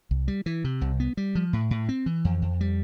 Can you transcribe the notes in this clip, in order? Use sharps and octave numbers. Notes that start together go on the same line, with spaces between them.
C2
G3
E3
C3
C2
B3
G3
F3
A2
A2
C4
E3
F2
F2
G3